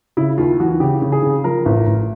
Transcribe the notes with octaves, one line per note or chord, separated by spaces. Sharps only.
C#3 E4
D#2 F4
E3 F#4
C#3 G4
C#3
G#4
C#3
F3 A#4
A1
A1